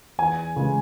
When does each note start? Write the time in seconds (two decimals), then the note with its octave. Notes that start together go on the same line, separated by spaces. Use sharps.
0.19 E2 G#5
0.56 C#3 G#3